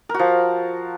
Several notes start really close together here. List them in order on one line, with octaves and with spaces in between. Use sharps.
A#4 F#4 F3